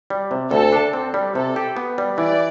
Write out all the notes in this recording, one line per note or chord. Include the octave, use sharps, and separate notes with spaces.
G3
C3
D2 A4
D4
C4
G3
C3 A4
G4
B3
G3
E3 D5